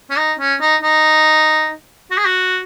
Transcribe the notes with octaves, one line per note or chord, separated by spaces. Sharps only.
C#4
D#4
C#4
D#4
D#4
F#4
G#4
F#4